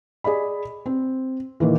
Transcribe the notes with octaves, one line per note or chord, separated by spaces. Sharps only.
G#4 D5 D#5 B5
C4
A#2 D#3 E3